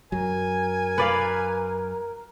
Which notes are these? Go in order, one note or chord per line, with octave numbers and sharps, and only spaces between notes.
F#2 F#3 A#4 G#5
B4 D5 F5